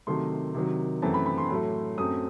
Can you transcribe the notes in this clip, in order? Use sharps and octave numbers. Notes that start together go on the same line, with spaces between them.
C3 D#3 F#3 A3 C6
C3 D#3 F#3
F#2 E3 A3 C4 A5
B5
B5
C6
A2 F#3 A3
F#2 F#3 A3 C4 D#6